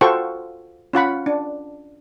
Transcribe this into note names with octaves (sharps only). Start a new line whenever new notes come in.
F4 F#4 A4 C5 G5 C#6
C#4 F4 F#5 B5
D4